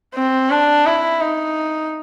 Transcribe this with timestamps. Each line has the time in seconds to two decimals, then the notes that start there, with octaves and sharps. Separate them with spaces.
0.15 C4
0.51 D4
0.86 E4
1.21 D#4